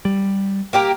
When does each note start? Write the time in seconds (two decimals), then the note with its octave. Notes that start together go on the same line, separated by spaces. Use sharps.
0.05 G3
0.73 A#3 G4 A#4